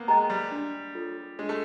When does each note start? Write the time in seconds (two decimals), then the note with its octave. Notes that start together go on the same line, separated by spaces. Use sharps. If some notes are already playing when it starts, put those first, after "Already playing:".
Already playing: A#3 B3
0.08 G#3 D#5 G5 A#5
0.30 G3
0.51 D4
0.95 F4 A4 C#5
1.39 G#3 D4
1.49 A3